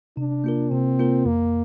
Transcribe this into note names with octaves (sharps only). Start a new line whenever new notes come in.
C3 D4
A#3 F4 A#4
C3 C4
A#3 F4 A#4
F2 A#3